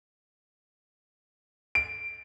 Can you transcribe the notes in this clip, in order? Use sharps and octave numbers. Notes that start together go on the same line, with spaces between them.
D7